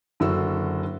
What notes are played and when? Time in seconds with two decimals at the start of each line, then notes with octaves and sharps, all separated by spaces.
0.20 F#1 D3 F#4 E6